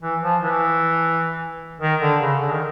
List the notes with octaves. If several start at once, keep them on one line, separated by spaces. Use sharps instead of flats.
E3
F3
E3
D#3
D3
C#3
D3
D#3